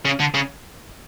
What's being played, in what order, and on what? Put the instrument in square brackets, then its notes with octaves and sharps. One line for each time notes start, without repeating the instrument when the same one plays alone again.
[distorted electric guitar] C#3
D3
C#3